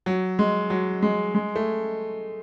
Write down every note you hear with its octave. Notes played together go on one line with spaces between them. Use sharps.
F#3
G#3
F#3
G#3
G#3
A3